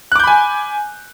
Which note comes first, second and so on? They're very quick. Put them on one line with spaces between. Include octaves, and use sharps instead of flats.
F#6 D6 G6 B5 G#5